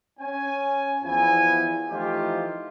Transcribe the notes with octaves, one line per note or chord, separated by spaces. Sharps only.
C#4 G#5
E2 F3 B3 E4 G#5
E3 F3 A3 D#4 F4 G4